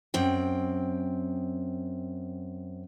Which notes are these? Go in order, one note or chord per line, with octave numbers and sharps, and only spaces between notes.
F#2 C4 G5